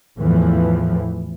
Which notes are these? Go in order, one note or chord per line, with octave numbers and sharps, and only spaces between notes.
E2 A2 E3 F3